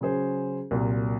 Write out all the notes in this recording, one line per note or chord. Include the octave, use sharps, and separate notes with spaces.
C#3 F#3 C#4 G#4 C5
C2 A#2 F#3